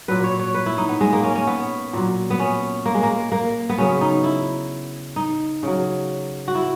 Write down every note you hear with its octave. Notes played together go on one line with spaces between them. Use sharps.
A#2 F#3 B4
C#5
C#5
B4
E4
D#4
B3
G#3
A#3
C#4
C#4
B3
A#2 F#3
B3
C#4
A#3
G#3
A#3
A#3
B3
C#3 F#3 C#4
D#4
E4
D#4
C#3 F#3
F#4
E4